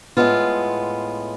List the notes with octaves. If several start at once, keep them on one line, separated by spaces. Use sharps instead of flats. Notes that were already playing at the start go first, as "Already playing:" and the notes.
A2 G#3 B3 F4